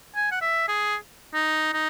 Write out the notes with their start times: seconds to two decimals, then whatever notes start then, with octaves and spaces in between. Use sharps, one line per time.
0.16 G#5
0.32 F#5
0.41 E5
0.68 G#4
1.34 D#4
1.73 D#4